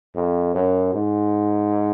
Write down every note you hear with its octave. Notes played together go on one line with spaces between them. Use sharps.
F2
F#2
G#2